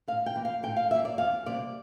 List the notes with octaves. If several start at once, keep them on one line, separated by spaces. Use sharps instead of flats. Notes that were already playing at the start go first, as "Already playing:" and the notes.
A2 F5
G5
E3 A#3
F5
A2 G5
F5
E3 A#3 E5
D5
E2 F5
C3 G3 A#3 D5